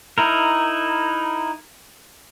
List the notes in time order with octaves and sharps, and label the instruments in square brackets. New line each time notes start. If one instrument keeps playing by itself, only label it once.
[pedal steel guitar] D#4 E4 A#4